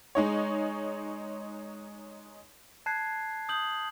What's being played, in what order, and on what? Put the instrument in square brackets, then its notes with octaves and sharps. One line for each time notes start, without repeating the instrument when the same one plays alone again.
[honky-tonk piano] G#3 D#4 C#5
[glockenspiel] A5 F#6 G#6 C7
D#6 G6 F#7